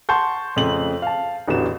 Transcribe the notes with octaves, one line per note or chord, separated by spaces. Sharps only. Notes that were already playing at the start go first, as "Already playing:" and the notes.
F#5 A5 C6 C#6 G6
F2 C#3 A3 C6 F#7
F5 A5
A1 E2 D3 F#4 G4 E7